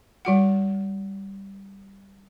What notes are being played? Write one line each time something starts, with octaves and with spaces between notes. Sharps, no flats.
G3 F#4 F#5